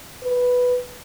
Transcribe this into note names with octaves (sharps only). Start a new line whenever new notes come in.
B4